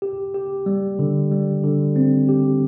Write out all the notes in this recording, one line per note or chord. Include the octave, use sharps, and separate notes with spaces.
G4
G4
G3
D3
G3
D3
C4
G4